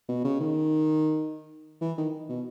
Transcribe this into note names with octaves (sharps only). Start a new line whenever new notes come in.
B2
C#3
D#3
E3
D#3
B2